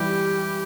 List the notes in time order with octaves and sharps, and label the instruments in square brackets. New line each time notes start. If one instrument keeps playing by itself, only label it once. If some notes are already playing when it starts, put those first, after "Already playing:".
Already playing: [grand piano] E3 G3 [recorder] G4